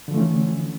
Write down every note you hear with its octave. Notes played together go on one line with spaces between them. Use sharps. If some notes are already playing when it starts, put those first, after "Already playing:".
D3 E3 F3 A3 C#4